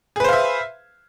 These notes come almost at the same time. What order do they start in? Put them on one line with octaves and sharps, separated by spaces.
G#4 B4 C5 F5 E5